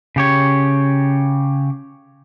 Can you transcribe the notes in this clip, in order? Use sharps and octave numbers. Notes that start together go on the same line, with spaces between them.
C#3 G4 C#5